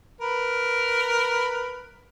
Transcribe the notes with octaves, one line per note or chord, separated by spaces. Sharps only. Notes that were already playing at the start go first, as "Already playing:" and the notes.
A#4 B4